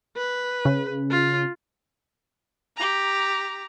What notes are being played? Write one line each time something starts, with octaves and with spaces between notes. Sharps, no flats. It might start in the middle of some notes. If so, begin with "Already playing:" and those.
B4
C#3
F4
G4 A#5